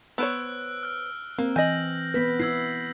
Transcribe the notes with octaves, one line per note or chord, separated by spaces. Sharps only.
B3 C5 C#5 E6 F#6 D7
F6 F#6
A#3 C4
E3 D#5 G#5 G6 A#6 F#7
B3 B4 G6 B6
E4 E6 G#6 C7